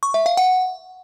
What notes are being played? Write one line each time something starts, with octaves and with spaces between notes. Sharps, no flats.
C#6
E5
F5
F#5